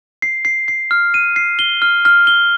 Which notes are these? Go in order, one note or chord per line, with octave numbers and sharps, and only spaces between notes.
C7
C7
C7
F6
D#7
C7
G7
F6
F6
G7